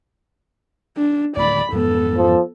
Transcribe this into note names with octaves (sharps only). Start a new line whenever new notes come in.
D4
D1 D#2 A3 D5 B5
F2 G#2 E3 B3 A4
F3